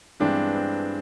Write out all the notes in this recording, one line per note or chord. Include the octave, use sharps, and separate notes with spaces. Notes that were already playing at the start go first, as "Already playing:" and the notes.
G2 E3 G#3 B3 C4 D4
C4